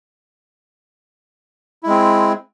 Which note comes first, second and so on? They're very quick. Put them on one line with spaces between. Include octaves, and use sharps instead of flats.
E4 G#3 C4